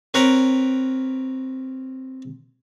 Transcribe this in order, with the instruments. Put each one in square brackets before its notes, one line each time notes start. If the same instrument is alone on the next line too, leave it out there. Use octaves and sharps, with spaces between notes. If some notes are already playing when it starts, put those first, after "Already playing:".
[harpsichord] C4 A#4 B4 C#5 G5 A#5